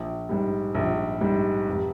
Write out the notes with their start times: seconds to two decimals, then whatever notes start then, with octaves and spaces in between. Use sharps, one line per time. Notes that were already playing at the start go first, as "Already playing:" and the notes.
Already playing: A#1
0.29 G#2 G3
0.75 A#1
1.21 G#2 G3
1.68 F1